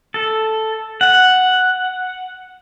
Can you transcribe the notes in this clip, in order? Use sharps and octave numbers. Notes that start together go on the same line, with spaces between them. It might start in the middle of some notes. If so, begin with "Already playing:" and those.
A4
F#5